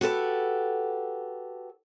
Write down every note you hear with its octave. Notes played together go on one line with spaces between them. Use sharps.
F#4 G4 A4 B4